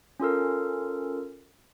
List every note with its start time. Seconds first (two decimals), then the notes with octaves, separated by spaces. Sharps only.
0.20 C#4 F4 A4 A#4